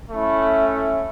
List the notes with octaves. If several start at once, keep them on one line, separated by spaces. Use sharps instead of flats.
A3 C#4 E4
E4 E5